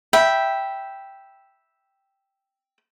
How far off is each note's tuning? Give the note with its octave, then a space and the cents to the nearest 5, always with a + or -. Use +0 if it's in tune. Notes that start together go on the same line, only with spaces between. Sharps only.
E5 +0 G5 +0 B5 -10